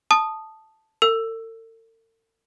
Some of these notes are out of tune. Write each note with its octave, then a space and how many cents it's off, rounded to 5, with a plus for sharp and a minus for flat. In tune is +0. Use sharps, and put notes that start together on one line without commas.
A5 +0 D#6 -10
A4 +45 E6 +10